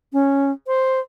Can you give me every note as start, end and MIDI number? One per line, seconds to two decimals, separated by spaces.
0.13 0.51 61
0.67 1.00 72